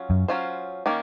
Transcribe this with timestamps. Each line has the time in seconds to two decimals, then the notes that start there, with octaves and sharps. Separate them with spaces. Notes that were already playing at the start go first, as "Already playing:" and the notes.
Already playing: F#3 C#4 F4
0.10 F#2
0.28 F#3 C#4 F4 C5
0.86 D#3 A#3 C#4